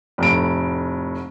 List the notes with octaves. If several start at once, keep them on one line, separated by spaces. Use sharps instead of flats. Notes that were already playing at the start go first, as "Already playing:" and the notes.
F1 A2 D7